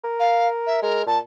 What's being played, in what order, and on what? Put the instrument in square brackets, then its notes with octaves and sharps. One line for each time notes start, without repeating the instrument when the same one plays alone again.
[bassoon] A#4
[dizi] F5
E5
[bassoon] G#3 [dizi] A#4
[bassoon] A#2 [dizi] A5